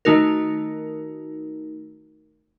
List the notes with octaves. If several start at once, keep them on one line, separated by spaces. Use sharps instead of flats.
D#3 A3 D#4 F#4 A#4